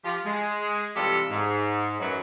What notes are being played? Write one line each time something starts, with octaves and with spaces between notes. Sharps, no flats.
F3 F4 G4
G#3
C3 E3 G3 F4 G4 A4
G#2
F#2 E3 F#3